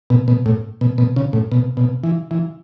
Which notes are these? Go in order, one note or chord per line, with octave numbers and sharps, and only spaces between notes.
B2
B2
A2
B2
B2
C#3
A2
B2
B2
E3
E3